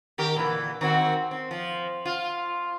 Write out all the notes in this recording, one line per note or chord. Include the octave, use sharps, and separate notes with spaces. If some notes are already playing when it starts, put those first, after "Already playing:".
D#3 G4 A#4
A#2 D3 E3
D#3 C4 F#4
C4
F3
F4